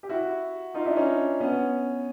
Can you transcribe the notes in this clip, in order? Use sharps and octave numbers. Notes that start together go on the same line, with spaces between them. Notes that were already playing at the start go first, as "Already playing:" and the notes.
G4
E4 F#4
D#4 F4
D4 E4
C#4 D#4
B3 C#4